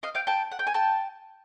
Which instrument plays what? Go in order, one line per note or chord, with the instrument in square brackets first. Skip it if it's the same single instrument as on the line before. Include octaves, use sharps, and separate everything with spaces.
[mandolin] D#5 F5
F5 G5
G5 A5
F#5
G5
G#5
G5 A5